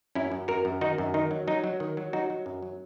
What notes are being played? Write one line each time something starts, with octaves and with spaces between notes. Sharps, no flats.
F#2 C#4 E4
F#2
F#2 F#4 A#4
F#2
D#3 D#4 F#4
F#2
D#3 D#4
F#3
F#3 D#4
F#3
D#3
F#3
F#3 D#4 F#4
F#3
F#2
F#3